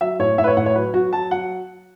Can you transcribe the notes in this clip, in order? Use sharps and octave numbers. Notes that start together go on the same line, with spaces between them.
F#3 E5
A2 C#5
A2 E5
B4
C#5
A2 F#5
C#5
F#3 B4
F#3 F#4
F#3 A5
F#3 F#5